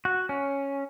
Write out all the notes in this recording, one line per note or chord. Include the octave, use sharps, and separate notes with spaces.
F#4
C#4